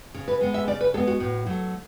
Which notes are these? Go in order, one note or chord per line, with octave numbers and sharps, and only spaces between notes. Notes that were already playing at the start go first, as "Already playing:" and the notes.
C#3
B4
G#3 B3
E5
C#3 D5
B4
G#3 B3 A4
F#4
A2
F#3 A3